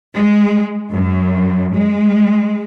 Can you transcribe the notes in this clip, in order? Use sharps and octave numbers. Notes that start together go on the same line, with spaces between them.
G#3
F#2
G#3